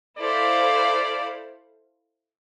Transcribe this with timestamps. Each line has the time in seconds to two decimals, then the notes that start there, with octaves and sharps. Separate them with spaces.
0.18 E4 A4 C5 D5 F5